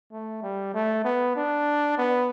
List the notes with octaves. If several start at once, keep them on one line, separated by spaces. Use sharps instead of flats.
A3
G3
A3
B3
D4
B3